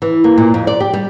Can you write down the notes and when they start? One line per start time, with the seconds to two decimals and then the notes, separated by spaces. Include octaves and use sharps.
0.02 E3
0.24 A#3
0.38 A#2
0.54 F2
0.67 D5
0.80 G4
0.93 G3